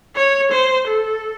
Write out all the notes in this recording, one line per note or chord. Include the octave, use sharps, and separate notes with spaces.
C#5
C5
A4